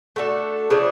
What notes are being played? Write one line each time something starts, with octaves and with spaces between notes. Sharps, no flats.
A3 D4 F#4 A4
C#3 F3 A3 D4